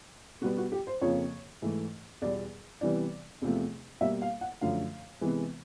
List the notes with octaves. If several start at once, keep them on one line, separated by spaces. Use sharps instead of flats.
B2 G3 B3 F#4
F#4
G4
C5
F2 C#3 F3 A#3 C#5
G#2 E3 A3
E2 B2 G3 D5
C3 E3 G3 B3 D5
E2 C3 F3 A3
B2 G3 A#3 E5
F5
F#5
F#2 D3 F3 A3 F5
C3 E3 G#3 B3